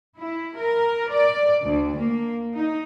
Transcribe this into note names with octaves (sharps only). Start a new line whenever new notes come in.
E4
A#4
D5
D2
A#3
D#4